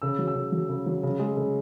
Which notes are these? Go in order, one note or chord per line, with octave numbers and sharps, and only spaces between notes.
C#3 E6
F#3
E6
C#3
F#3
C#3
F#3
C#3
G#3
C#3